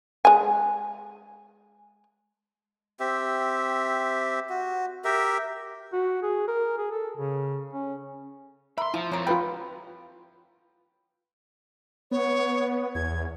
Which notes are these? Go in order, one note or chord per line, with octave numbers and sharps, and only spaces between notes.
G#3 G#5
C4 G4 E5
F#4
G4 A#4 E5
F#4
G#4
A#4
G#4
A4
C#3
C#4
A#4 E5 B5 C6
F3 E4 F4
F2 F3 A#4 C#5
G3 F4 F#4 B4 G5 B5
B3 C#5
E2 G#6